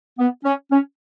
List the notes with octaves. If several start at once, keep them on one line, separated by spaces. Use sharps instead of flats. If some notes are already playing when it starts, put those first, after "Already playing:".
B3
C#4
C#4